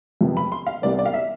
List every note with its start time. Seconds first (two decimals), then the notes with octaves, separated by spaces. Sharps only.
0.21 F2 C3 F3 B3
0.37 B5
0.52 C6
0.67 F5
0.82 C2 C3 G3 B3 D5
0.99 D5
1.06 F5
1.14 E5